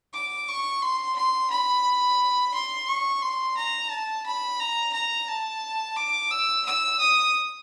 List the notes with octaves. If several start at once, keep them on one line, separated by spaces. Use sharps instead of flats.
D6
C#6
C6
C6
B5
C6
C#6
C6
A#5
A5
B5
A#5
A#5
A5
D6
E6
E6
D#6